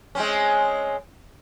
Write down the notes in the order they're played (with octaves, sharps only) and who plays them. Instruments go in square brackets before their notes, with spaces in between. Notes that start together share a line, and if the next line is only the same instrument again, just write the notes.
[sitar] G#3 C4 C#4